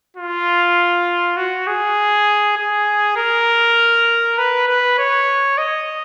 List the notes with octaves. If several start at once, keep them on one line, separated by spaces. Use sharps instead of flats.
F4
F#4
G#4
G#4
A#4
B4
B4
C#5
D#5